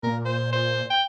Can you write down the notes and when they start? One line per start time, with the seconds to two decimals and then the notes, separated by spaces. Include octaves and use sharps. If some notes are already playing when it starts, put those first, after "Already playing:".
0.03 A#2 A#4
0.25 C5
0.53 C5
0.90 G5